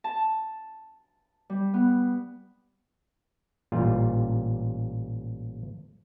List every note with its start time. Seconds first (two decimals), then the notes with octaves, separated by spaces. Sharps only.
0.04 A5
1.50 G3
1.74 B3
3.72 A1 A#2 G3 F4